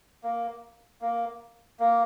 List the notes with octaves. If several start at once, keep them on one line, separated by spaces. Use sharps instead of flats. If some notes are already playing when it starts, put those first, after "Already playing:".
A#3
A#3
A#3